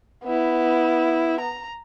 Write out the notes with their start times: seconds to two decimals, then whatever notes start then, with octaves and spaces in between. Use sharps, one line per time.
0.24 B3 E4
1.40 A#5